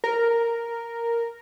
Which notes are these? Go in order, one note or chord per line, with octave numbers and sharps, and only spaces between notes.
A#4